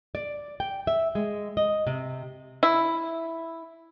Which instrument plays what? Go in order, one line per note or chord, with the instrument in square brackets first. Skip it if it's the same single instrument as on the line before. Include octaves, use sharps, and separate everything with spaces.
[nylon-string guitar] D5
G5
E5
G#3
D#5
C3
[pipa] E4